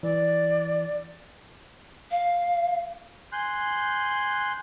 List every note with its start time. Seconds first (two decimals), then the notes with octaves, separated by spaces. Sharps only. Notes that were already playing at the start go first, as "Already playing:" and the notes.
0.03 E3 D5
2.11 F5
3.32 G#5 C6 F#6 G6